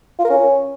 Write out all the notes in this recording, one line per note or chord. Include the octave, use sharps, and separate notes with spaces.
F4
A#4
C#4